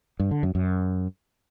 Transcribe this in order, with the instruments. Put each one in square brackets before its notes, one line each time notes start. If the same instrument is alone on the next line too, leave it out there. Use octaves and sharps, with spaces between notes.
[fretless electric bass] G2
D3
F#2
F#2